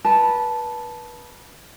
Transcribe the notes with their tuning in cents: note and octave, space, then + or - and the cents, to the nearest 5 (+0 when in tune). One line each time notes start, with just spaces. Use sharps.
B4 -25 A5 -10